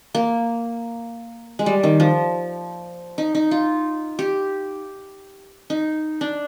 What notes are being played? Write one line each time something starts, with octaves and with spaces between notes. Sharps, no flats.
A#3
G#3
G3
D#3
F3
D#4
D#4
F4
G4
D#4
D4